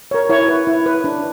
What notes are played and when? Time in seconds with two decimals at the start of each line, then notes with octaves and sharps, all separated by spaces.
0.11 A#4 C#5
0.29 E4 C#5
0.48 B4
0.67 E4
0.86 B4
1.04 D4